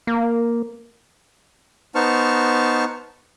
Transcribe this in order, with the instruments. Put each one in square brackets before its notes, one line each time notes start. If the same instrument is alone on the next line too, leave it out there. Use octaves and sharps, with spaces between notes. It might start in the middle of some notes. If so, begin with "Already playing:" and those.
[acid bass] A#3
[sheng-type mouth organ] B3 D#4 C5 A5 C#6 F6